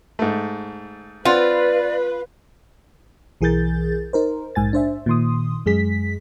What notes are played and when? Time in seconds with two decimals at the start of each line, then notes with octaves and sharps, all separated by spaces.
0.19 G#2 A3
1.25 C4 F4 B4 D5 F#5
3.41 B1 E3 G#4 A#4 G6 A6
4.13 D#4 A#4 C5
4.55 A#1 G#2 G#5 A6
4.73 D4 C5 E5
5.06 A#2 D#3 C6 D#6
5.66 F#2 G#3 G#4 B6